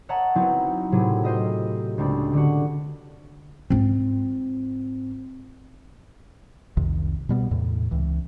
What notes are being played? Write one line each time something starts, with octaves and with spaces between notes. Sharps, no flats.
C#5 D#5 E5 F#5 A5 A#5
F#3 B3 C4 D#4 E4
A2 C3 F#3 C4 G#4
F4 C5 D#5 E5
C#2 C4 D4
D3 F#4
G#2 C4 F4
C2 F2 C3 D#3
B2 G3 B3
E2 A2 C3
C#2 E3